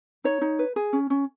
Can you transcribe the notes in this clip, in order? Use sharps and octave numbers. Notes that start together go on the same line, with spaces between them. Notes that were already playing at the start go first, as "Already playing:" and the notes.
D#4 C#5
D#4
B4
G#4
C#4
C#4